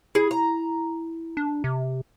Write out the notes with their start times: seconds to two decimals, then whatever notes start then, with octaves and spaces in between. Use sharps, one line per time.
0.15 E4 G#4
0.31 A#5
1.37 D4
1.64 C3